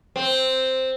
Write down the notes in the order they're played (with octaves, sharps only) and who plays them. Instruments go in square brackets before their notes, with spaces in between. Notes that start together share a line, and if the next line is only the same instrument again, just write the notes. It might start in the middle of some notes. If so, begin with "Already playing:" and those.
[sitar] C4